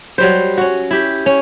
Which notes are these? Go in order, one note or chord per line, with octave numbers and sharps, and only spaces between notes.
F#3 G3 C5
C#4 F#4
E4 G4
C#4